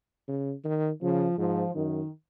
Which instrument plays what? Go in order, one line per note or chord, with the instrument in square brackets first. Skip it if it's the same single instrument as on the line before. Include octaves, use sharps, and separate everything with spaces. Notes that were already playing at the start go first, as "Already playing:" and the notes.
[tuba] C#3
D#3
[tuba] C#3 [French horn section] F3
[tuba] G#2 [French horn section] F3
[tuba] F#2 [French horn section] D#3